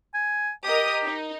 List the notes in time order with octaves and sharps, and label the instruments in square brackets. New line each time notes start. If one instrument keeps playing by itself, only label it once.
[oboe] G#5
[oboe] G4 [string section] A#4 D#5 D#6
[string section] D#4